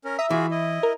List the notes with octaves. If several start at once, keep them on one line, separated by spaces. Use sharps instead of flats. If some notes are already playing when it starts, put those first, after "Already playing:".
C#4 A#4
E5 A#5 D#6
E3 F4 F#4 G#4
E4 D#5
A#4